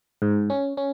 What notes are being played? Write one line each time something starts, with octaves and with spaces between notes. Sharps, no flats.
G#2
C#4
C#4